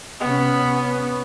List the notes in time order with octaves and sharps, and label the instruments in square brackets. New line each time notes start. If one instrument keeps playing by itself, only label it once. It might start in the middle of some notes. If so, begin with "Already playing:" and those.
[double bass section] C3 C#4 [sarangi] B3